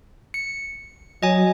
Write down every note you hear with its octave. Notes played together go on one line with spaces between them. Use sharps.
C#7
F#3 D#5 G#5